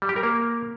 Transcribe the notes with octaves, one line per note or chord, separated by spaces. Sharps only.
G3
G4
A#4
A#3